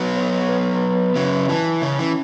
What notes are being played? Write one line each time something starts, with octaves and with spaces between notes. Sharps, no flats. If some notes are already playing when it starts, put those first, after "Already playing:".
Already playing: F#3 B3
C#5
B4
B4
C#3 F#3 E5
E3 A5
C#3 C#4
E3